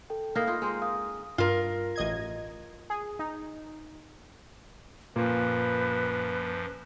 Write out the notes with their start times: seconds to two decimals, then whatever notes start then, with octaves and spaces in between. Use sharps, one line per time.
0.10 A4 G5
0.36 A#3 D#4 E4 F6 A#6 C7
0.47 D#4 F4
0.62 G#3 C4
0.82 F5 D#6
1.38 G2 F4 A#4
1.96 A1 D#5 G#6
2.90 G#4
3.19 D#4
5.16 F#2 A#2 F3 A#3 B4